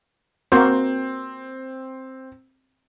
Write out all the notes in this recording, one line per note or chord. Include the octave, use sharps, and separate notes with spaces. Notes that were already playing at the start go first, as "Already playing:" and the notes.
A#3 C4 F#4 C5